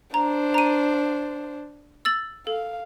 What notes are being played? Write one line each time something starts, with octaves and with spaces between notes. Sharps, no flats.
D4 C5 A#5
A#5 D#7
E6 A6 F#7
A4 F5